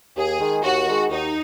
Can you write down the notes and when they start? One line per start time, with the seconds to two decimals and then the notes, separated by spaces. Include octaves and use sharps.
0.17 D#2 G#4
0.40 D#3 G#3
0.63 D#2 F#4
0.87 D#3 G#3
1.10 D#2 D#4